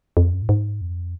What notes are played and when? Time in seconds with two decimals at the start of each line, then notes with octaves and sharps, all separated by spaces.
0.17 F2
0.33 F#2
0.42 A2
0.49 G#2
0.81 F2